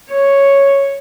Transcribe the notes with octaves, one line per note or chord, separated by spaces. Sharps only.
C#5